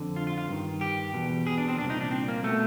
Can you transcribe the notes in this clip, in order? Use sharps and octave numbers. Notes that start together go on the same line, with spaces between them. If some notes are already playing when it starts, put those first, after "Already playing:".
Already playing: F2 D3
F4
F4
F4
G2 D#3
G4
E2 B2
G#4
D4
C4
C2 A#2 D4
D#4
D4
C4
A#3
B2 A3